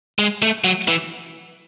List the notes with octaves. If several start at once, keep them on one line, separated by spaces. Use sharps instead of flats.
G#3
A3
F#3
E3